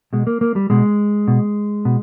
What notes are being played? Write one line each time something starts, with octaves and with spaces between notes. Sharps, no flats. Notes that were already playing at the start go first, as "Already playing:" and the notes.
B2 G#3
A#3
A#3
G3
B2 G#3
B2
B2